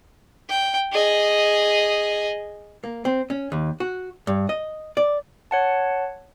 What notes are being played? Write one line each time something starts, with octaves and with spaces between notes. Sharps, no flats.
G5
G#4 D#5
A#3
C4
C#4
D#2
F#4
G2
D#5
D5
C#5 F#5 A5